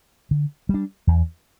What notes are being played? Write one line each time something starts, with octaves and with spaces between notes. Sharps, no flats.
D3
G3 D4
E2